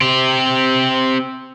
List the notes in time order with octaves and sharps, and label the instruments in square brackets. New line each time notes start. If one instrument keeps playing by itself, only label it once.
[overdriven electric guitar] C4 G4